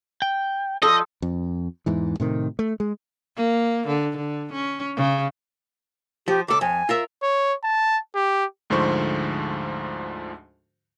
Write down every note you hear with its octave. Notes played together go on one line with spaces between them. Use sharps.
G5
F3 A4 D#5 D#6 E6
F2
E2 G#2 E3
A2 C3 D#3
A3
G#3
A#3
D3
D3
C#4
C#3
F3 G4
C#2 A4 D6
F2 G#5
F4 A#4 E5
C#5
A5
G4
D2 G#2 D3 F3 C5 C#6